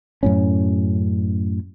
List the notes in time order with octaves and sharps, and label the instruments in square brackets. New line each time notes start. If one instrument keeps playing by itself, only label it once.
[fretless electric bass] F#2 A2 C#4